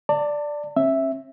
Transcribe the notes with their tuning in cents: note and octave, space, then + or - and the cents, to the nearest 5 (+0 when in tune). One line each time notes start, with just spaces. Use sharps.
D5 +0 A5 +35
C#4 -40 E5 +0